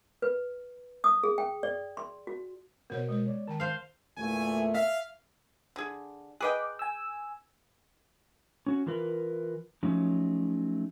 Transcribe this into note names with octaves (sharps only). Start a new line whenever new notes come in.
B4
D#6
G#4
G5
D5
C6
F#4
B2 B3 A#4 C5 C#5
G#3 C5
C#5 D5
D#3 G5 A5
C5 F5
E2 A#2 A3 G#5
E5 F5
D3 G#4
G#4 B4 D#5 G5 D6 F#6
G#5 E6
C#4 F#4
E3 F4 A#4 B4
F3 F#3 A3 C#4 D#4